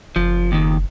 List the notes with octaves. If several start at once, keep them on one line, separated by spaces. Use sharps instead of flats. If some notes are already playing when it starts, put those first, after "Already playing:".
F#1 F3
D#2 D#3